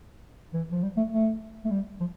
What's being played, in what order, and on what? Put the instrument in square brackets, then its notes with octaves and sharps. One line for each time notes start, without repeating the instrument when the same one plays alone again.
[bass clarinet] E3
F3
G3
A3
A3
A3
G3
F3